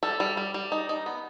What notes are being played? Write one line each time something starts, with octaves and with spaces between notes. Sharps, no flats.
G3 A4
G3
G3
G3
D#4
D#4
B3